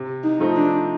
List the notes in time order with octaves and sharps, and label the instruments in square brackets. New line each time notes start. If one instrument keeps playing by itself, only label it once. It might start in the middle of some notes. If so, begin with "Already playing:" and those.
Already playing: [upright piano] C3
[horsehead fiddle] D#4
[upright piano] F3 A3 C4 D#4
[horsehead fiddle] D4